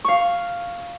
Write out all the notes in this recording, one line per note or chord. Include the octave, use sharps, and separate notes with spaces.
F5 C#6